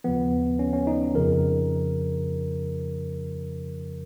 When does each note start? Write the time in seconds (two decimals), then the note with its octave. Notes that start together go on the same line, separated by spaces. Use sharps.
0.04 D#2 C#3 F3 B3
0.59 C#4
0.73 C#4
0.87 D#4
1.14 F2 C#3 F3 A#4